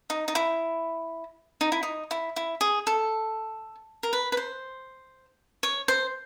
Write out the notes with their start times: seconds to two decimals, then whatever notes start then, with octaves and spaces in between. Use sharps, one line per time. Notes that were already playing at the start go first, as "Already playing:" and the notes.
0.10 D#4
0.28 D#4
0.35 E4
1.61 D#4
1.72 E4
1.83 D#4
2.11 E4
2.36 E4
2.61 G#4
2.87 A4
4.03 A#4
4.13 B4
4.32 B4
4.37 C5
5.63 C#5
5.88 C5